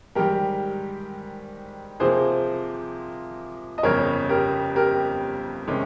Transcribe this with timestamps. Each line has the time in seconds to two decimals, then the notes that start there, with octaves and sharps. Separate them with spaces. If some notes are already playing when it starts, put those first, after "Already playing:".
0.15 G#2 D#3 G3 G4 A#4
2.00 C3 F3 A#3 G#4 C5
3.78 D#5
3.83 G1 F2 C#3 A#4 C#5
4.29 G4 A#4
4.76 G4 A#4
5.68 C3 D#3 G#3 C#4